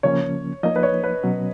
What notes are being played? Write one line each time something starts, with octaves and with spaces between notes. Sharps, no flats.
C#3 F3 A#3 C#4 C#5
F3 A#3 D#4 D#5
B4
C#5
B4
B2 F#3 C#4